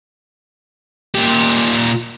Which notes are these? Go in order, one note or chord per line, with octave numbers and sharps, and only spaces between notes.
A#2 G4